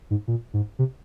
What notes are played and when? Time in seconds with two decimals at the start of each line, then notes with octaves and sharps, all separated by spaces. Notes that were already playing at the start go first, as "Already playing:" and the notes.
0.11 G#2
0.28 A#2
0.54 G#2
0.79 C3